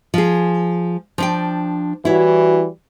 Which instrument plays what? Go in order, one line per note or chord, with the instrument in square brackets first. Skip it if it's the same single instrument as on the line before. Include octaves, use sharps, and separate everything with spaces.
[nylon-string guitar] F3 G#4
F3 D4 G5
[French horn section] E3 G3 F#4 [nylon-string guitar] E4 C#5